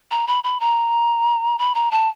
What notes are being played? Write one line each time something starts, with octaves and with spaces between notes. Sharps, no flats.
A#5
B5
B5
A#5
B5
A#5
A5